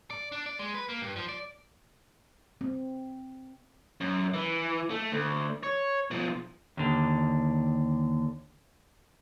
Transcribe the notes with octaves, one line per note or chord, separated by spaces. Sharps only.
D5
D4
D5
G#3
B4
A#3
G2
F3
D5
C4
F#2
E3
A3
D2
C#5
B2 F3
D#2 D3